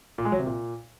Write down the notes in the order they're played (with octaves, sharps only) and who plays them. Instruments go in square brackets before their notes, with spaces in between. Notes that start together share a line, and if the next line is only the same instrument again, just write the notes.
[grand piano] A#2
G#3
F#3
C3
A#2